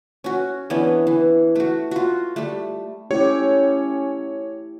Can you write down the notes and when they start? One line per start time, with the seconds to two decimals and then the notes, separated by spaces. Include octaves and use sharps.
0.24 C#4 F#4
0.70 E3 B3 C#4 D4
1.07 E3
1.55 A3 F#4
1.91 F4 F#4
2.36 G3 A3
3.11 A3 C#4 E4 G4 C#5